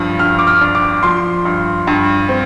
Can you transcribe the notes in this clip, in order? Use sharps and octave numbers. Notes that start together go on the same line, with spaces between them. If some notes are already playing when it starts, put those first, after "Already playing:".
Already playing: G2 F3
G2 F6
D6
F6
D4
D6
F3 C6
G2
G2
C4